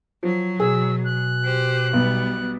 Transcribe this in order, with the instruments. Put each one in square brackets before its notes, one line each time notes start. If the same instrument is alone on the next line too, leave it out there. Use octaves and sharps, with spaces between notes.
[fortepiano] F3 [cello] F#3
[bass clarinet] B2 [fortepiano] G#4 [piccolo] E6
[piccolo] F#6
[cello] G4 C5
[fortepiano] B1 [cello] G3 B3